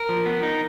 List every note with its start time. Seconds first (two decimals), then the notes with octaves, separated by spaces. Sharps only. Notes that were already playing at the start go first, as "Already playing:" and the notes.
Already playing: A#4
0.09 F3
0.26 B3
0.43 D#4